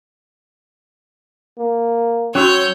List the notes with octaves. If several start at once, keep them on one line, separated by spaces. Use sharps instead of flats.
A#3
F#3 C#4 F#4 C#5 C6 C#6 E6 G6